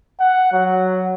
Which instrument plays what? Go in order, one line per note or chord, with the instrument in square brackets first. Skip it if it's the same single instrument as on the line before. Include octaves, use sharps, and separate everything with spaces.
[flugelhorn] F#5
F#3